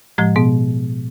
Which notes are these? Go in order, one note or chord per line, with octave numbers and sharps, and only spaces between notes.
A2 F3 G#3
B2 B3